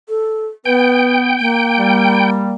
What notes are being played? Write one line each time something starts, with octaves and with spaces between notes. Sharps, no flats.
A4
B3 B4 G5
A#3
G3